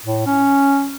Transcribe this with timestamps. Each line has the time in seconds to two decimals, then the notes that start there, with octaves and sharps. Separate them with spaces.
0.05 A2
0.27 C#4